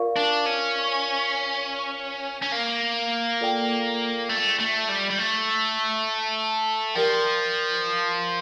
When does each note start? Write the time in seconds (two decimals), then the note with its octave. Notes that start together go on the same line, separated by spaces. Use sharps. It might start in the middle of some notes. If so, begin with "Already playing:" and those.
Already playing: F4 A#4 D5 F5 C#6
0.16 D4
0.46 C#4
2.42 C#4
2.52 A#3
3.41 F4 A4 D5 G5
4.29 A3
4.59 A3
4.89 G3
5.10 G3
5.19 A3
6.95 F3 G4 A#4 D5 G5